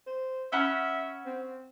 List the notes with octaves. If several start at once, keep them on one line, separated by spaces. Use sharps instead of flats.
C5
C#4 E5 F#5 B5
C4